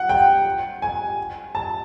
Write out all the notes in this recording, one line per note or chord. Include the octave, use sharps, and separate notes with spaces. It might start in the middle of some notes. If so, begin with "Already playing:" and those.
Already playing: F#5
G5
G#5
A5